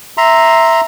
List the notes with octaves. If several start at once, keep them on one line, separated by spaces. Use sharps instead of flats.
E5 A#5 C6